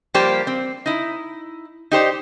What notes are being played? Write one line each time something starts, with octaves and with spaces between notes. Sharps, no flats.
F3 G3 A#3 G4 C5
C4
D#4 E4
D#4 G4 C5 D5